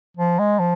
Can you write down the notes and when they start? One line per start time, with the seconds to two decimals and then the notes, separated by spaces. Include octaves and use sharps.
0.17 F3
0.39 G#3
0.59 F3